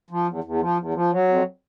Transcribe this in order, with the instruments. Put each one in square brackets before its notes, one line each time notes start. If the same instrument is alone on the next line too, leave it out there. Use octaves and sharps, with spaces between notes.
[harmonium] F3
E2
E2
F3
E2
F3
F#3
F2